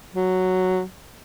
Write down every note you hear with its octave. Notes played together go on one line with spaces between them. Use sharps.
F#3